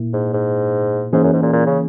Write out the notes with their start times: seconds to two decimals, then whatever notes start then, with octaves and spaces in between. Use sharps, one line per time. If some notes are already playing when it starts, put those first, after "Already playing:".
Already playing: A#2 A#3 E4
0.13 G#2
0.33 G#2
1.13 G#2 E3 A#3 C#4 G#4
1.24 F#2
1.33 G#2
1.43 A#2
1.53 A#2
1.66 C#3